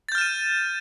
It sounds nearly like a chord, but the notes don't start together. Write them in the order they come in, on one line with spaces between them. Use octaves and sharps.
A6 G6 F6 E7 D#7